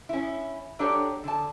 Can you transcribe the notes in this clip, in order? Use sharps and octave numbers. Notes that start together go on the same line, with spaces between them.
C#4 E4
F#3 D4 G4 A4 C#5 D5
D3 A5